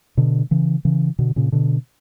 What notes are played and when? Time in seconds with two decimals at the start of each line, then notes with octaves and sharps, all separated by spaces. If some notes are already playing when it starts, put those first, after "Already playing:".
0.17 B2 D3
0.51 C#3 E3
0.85 C#3 E3
1.19 B2 D3
1.36 A#2 C#3
1.52 B2 D3